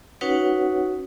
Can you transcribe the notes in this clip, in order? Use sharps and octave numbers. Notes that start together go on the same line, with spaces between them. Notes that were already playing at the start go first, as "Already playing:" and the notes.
C#4 D#4 F#4 B4 C#5 F#5